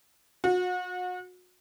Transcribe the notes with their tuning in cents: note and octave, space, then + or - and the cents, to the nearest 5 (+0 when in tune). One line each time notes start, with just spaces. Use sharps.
F#4 -35